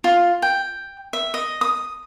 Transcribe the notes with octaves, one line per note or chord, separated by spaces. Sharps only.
F4
G5
E5
D#5
D#6